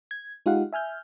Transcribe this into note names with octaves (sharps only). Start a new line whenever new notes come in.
G#6
G#3 D#4 F4 G4 F5 F#5
E5 G#5 F6 G6